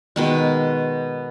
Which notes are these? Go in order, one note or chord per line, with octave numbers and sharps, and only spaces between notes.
B2 D#3 G#3